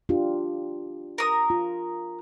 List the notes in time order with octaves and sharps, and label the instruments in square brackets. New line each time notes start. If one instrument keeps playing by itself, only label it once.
[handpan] D4 F4 G4
[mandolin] A#4 D#6
[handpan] F4